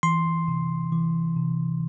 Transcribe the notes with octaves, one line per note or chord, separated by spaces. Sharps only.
E3 C6
C3
E3
C3